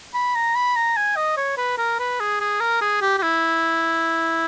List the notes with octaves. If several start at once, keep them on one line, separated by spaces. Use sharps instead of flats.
B5
A#5
B5
A#5
G#5
D#5
C#5
B4
A#4
B4
G#4
G#4
A#4
G#4
G4
G4
E4